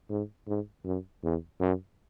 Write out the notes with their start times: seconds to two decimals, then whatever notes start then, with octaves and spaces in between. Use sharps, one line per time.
0.10 G#2
0.47 G#2
0.84 F#2
1.23 E2
1.60 F#2